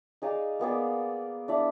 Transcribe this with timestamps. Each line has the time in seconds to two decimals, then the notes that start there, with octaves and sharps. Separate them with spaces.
0.22 D#4 G#4 D5 F5
0.59 A#3 B3 G#4 D5
1.48 D4 E4 D5